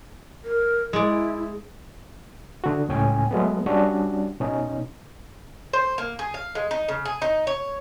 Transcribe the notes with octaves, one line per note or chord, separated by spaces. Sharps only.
A#4
G#3 E4 D5
D3 F#4
C#2 A2 C#4 G5 G#5
F#3 G#3 A3 B3
G3 C#4 D4 F#4
B2 C#4 D#4
C5
A#3
G#4
F5
G#3
D#4
C#3
G#4
D#4
C#5